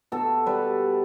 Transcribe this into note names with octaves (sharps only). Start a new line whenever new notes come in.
B2 A4
G3 B4